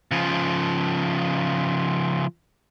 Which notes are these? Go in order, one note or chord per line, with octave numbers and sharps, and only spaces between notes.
C#3 F3